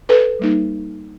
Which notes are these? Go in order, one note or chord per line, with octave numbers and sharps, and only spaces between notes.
A4 B4
G3 A#3 D#4